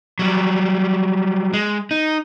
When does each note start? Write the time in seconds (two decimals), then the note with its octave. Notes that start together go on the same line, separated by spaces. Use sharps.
0.19 F#3 G3
1.53 G#3
1.91 D#4